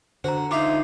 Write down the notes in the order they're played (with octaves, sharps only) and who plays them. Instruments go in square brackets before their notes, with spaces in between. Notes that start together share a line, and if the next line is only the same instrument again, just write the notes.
[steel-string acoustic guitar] D3 [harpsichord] F#4 [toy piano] C5 A#5
[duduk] D#4 [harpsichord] F4 E5 F5 [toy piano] C6 D6